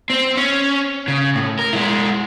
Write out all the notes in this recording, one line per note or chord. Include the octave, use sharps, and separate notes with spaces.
C4
C#4
C#3
A2
A#4
G#3 E4